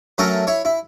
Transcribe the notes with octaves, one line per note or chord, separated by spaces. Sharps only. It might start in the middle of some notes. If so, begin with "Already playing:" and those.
F#3 A3 C#4 A4 A#4
E4 C#5
E4